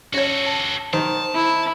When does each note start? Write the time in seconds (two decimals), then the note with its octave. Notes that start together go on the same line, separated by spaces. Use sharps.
0.14 C#4 F#4 A4 C#5
0.46 A5
0.93 D#3 C5 A5
1.35 E4